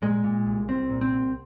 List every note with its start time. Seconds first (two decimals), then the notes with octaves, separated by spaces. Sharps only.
0.02 A#2 G#3
0.24 A#2
0.46 C2
0.68 C2 C4
0.90 A#2
1.01 C4
1.12 C2